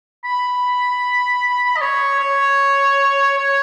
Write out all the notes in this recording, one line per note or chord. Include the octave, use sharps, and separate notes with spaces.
B5
D#5
C#5
C#5
C#5